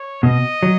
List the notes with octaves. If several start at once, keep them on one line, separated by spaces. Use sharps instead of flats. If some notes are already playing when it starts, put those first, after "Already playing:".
Already playing: C#5
B2 D#5
F#3